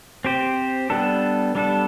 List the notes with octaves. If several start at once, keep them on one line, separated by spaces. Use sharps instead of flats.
C4 G4 C5
G3 B3 D4 A4
G3 B3 D4 A4